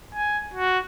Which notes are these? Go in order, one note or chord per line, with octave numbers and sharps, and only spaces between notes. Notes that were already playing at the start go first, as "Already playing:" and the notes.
G#5
F#4